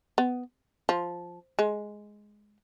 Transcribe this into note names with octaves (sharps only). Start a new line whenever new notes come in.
B3
F3
G#3